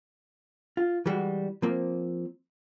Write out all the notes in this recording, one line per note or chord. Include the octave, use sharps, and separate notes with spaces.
F4
E3 G3 G#3 F#4
F3 A#3 C4